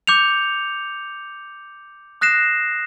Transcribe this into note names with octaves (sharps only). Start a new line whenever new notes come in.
D6 G6 C#7 F7
D#6 F#6 A#6 C7 E7